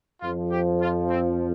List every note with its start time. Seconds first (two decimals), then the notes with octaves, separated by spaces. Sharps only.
0.22 F2 F3 F4
0.51 G4
0.81 F4
1.10 C4